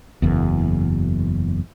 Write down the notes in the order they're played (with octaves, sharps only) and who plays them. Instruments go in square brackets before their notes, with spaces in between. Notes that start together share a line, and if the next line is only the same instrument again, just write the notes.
[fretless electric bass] F#1 E2